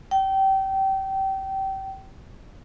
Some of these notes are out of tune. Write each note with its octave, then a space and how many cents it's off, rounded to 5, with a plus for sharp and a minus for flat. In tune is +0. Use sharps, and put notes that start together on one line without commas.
G5 -25